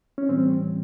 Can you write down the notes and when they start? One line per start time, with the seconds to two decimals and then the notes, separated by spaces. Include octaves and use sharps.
0.18 C#4
0.29 A2 E3 G3 C4